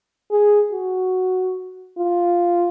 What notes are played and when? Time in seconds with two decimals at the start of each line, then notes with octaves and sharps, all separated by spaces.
0.31 G#4
0.72 F#4
1.98 F4